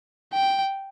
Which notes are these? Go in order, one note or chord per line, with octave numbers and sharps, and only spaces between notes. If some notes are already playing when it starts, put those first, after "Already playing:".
G5